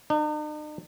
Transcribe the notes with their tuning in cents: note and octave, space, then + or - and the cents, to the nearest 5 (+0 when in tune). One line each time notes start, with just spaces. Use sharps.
D#4 -45